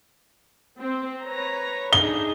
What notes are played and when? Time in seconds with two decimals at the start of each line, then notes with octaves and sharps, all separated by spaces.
0.80 C4
1.24 B4 C#5 A#5
1.93 D4 D#4 G#4 G7